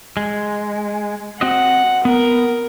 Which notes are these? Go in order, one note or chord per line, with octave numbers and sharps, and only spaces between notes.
G#3
C4 F#4 D#5 F#5
B3 A#4